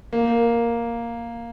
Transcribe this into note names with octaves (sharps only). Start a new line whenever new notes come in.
A#3